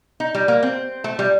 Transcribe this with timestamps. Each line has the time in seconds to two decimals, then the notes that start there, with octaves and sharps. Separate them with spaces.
0.20 D#4
0.35 G3
0.48 A#3
0.63 C4
1.04 A3
1.19 G3